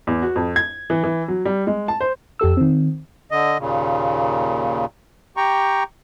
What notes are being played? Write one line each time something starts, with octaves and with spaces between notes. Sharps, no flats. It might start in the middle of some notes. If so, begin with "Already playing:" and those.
E2
F#4
F2
G#6
E3
E3
F#3
G3
G#3
A5
C5
F2 G4 A4 E6
D#3 C4
D3 D#5
D#2 A#2 C#3
G4 G5 A#5 C#6